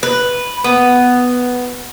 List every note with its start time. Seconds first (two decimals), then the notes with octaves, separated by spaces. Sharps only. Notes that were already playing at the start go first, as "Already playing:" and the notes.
0.03 B4
0.64 B3